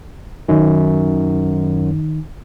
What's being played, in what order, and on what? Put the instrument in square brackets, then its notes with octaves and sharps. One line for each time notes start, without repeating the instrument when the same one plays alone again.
[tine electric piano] F#2 [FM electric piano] D#3 D#4